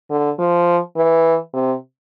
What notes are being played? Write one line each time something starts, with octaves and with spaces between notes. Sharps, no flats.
D3
F3
E3
C3